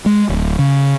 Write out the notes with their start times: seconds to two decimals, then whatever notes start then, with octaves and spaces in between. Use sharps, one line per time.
0.06 G#3
0.29 D1
0.59 C#3